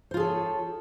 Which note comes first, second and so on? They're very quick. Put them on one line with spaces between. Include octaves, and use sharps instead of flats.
C5 F4 G#4 A4 C#5